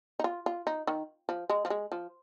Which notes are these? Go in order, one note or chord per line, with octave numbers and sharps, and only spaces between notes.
D#4
F4
F4
D#4
D#3
F3
G#3
F3
G#3
F3